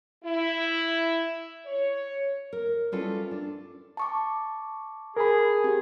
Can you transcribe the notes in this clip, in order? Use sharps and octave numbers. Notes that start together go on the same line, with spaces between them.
E4
C#5
A#4
G3 C#4 E4 F4 A4 B4
D4
A5 C#6 D6
G#4 A#4 B5
C4 G4 G#4